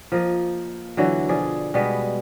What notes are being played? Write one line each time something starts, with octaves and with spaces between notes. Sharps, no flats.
F3 A#3 D#5
D3 E3 F#3 F#4
B2 F3 G#4 D5
B2 G3 G#3 B3